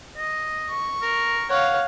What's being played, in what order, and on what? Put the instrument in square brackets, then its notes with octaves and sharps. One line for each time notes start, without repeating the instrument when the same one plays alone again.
[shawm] D#5
[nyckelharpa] C#6
[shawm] A#4
[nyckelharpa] C#5 F5 [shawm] F#5